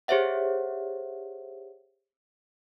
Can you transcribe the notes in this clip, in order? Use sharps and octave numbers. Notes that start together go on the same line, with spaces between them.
G4 G#4 C5 C#5 E5 F#5